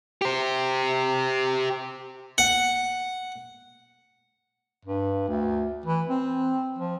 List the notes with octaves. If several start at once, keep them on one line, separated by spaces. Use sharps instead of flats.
G4 C5
F#5
G2
D2
E3
C4
F3